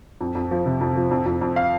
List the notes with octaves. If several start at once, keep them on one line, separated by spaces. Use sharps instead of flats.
F2
F2
F3
C3
F2
F3
F2
F2
F2
F5